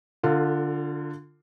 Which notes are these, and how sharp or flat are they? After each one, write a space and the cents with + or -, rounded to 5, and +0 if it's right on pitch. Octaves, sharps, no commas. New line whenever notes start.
D3 +0 F4 +0 A4 +40